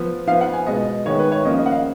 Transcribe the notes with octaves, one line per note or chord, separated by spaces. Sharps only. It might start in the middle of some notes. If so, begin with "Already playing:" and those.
Already playing: F3 B3
F3 B3 F5
F#5
G#5
B2 G#3 B3 D#5
D#3 G#3 B3 C#5
B4
C#5
C#3 F3 A#3 D#5
D#5
F#5
F5